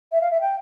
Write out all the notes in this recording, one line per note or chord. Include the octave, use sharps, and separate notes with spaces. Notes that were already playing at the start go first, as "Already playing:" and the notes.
E5
F5
E5
G5